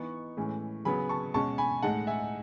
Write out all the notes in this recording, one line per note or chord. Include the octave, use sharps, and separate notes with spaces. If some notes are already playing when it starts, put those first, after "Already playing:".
Already playing: E3 B3 D#4 C#6
A2 E3 G#3 C#4
C#3 F#3 B3 G#5 B5
A5 C#6
B2 G#3 C#4 A5 C#6
G#5 B5
A2 G#3 D#4 F#5 A5
E5 G#5